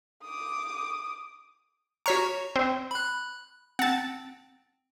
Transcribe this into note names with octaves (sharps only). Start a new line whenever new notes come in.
D6 D#6
F#4 C#5 A#5 C#6 F6 B6
C4
B5 F#6
C4 F#5 A5